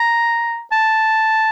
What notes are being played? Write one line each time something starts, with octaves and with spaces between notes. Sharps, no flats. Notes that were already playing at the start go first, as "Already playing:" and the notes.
Already playing: A#5
A5